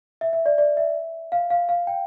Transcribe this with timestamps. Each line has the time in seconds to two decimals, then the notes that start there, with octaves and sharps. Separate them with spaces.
0.21 E5
0.33 E5
0.46 D5
0.58 D5
0.77 E5
1.32 F5
1.50 F5
1.69 F5
1.87 G5